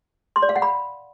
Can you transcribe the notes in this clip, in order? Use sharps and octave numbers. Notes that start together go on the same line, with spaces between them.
C6
D5
F5
F#5
B5